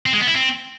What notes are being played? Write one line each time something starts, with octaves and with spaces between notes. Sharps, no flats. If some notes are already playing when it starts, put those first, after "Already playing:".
C4
G#3
B3
E4
C4